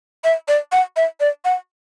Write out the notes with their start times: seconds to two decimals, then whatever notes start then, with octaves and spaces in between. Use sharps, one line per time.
0.24 E5
0.48 D5
0.72 F#5
0.97 E5
1.20 D5
1.45 F#5